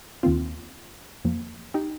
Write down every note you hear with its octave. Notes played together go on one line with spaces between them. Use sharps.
D#2 D#3 A#3 C4 F4
F2 F3 A#3
D#4 G4